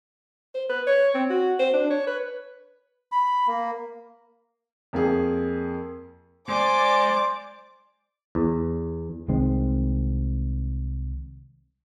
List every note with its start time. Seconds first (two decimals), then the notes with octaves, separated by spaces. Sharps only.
0.55 C5
0.70 B4
0.87 C#5
1.15 C4
1.30 F#4
1.60 C5
1.74 D4
1.90 C#5
2.07 B4
3.12 B5
3.47 A#3
4.93 F2 A#3 G#4
6.49 G#3 C5 D5 G#5 D6
8.35 E2
9.28 C2 D#3 G#3 C4